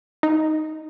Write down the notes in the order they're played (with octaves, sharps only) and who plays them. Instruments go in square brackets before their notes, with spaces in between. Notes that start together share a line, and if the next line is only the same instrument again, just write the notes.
[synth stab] D#4